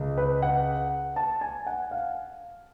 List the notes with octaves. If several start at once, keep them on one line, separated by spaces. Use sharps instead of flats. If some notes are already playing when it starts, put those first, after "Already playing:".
Already playing: C#2 C#3
B4
F#5
A5
G#5
F#5
F5